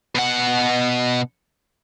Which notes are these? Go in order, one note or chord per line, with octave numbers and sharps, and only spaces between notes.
B2 F#5